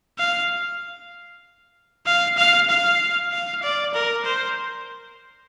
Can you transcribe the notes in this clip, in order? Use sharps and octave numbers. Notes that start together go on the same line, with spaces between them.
F5
F5
F5
F5
F5
D5
A#4
C5